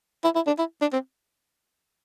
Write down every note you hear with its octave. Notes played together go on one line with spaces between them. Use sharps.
E4
E4
D4
E4
D4
C4